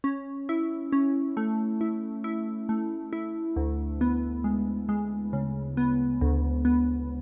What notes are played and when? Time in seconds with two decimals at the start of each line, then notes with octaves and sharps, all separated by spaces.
0.04 C#4
0.49 E4
0.93 C#4
1.37 A3
1.81 E4
2.24 E4
2.69 A3
3.13 E4
3.56 D2
4.01 B3
4.44 G#3
4.89 G#3
5.33 C#3
5.77 B3
6.21 D2
6.65 B3